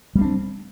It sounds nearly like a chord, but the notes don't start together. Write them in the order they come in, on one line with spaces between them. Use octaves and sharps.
G3 A#3 D4 C4